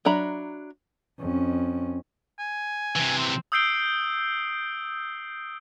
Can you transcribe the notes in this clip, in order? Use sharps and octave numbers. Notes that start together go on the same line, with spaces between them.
F#3 D4 E5 A#5 B5
F2 C#4
G#5
C3 E3
C4
D#6 E6 G6 C7 D7 G7